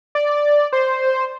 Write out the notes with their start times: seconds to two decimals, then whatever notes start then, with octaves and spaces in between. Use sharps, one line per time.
0.15 D5
0.73 C5